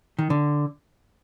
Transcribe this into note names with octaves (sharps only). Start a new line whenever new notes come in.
D#3
D3